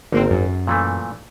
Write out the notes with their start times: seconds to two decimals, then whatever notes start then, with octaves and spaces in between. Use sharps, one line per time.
0.12 G#1 D3 A#3 C4
0.30 F#2
0.67 A#2 E3 A3